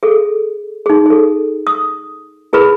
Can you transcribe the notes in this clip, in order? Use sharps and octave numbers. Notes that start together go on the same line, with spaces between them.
G#4 A4
D#4 G#4
G#4 A4
D#6
E4 G#4 A#4 B4 B5